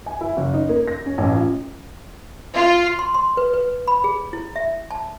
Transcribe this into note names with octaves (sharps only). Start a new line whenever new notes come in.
G#5
E4
F#1
D#4
A#3
A#6
C#4
A1
F4
F4
C6
C6
B4
B4
B5
G#4
E4
E5
A5